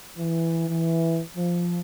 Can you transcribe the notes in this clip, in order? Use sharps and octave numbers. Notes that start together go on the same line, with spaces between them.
E3
E3
F3